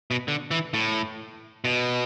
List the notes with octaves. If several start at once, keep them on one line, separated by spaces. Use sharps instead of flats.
B2
D3
E3
A2
B2